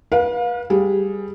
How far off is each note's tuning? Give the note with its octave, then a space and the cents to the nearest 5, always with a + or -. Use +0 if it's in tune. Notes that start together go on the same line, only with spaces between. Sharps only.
B4 -35 F5 +30
G3 +0 G#4 +0